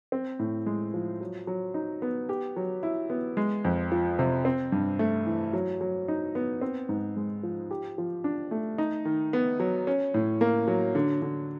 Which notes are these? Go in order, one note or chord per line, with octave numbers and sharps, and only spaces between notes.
C4
A2
G#3
F3
F#3
F#3
D#4
B3
G4
F#3
E4
B3
G#3
F2
F3
C3
C4
G2
A3
E3
F#3
F#3
D#4
B3
C4
G#2
G#3
F3
G4
F3
D4
A3
D#4
D#3
B3
F#3
C#4
A2
A#3
F#3
D3
D3